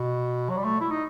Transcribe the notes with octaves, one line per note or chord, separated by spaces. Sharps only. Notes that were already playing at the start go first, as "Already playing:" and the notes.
Already playing: B2
F#3
G3
A3
E4
D#4